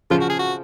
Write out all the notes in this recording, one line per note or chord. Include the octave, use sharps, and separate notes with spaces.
C#3 F3 F4
F#4
G#4
F#4